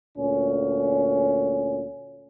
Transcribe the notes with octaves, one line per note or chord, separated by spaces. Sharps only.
D2 A#2 C#4